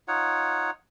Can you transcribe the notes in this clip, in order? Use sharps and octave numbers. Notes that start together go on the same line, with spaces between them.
D#4 F4 C#5 F#5